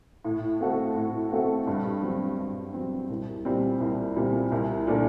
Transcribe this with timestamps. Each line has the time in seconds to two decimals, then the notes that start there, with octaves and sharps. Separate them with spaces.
0.25 A2
0.60 A3 C4 F#4 A4
0.96 A2
1.31 A3 C4 F#4 A4
1.67 G2
2.02 F#3 C4
2.38 G2
2.74 F#3 C4
3.09 C2
3.45 A#2 G3 C4
3.80 C2
4.16 A#2 G3 C4
4.52 C2
4.87 A#2 A3 D4